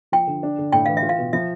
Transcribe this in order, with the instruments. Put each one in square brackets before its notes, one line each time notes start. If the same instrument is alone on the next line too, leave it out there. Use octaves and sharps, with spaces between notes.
[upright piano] F3 [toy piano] G5
[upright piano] D3
D4
D3
[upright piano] A2 [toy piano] G5
[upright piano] E3 [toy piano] F5
[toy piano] E5
[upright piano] F4
[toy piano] F5
[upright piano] B2
[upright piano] F3 [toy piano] E5